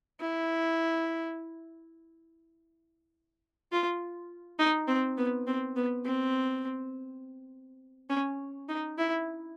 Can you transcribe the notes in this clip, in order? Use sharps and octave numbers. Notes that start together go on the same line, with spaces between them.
E4
F4
D#4
C4
B3
C4
B3
C4
C#4
D#4
E4